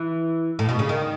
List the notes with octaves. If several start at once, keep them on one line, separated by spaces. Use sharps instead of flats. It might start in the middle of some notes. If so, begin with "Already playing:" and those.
Already playing: E3
A2
B2
C#3
D#3